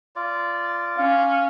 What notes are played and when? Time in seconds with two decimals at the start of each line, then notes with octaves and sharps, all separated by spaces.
0.16 F4 D5
0.97 C#4 F5